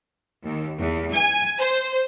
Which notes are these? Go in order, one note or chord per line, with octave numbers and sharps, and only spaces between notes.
D#2
E2
G#5
C5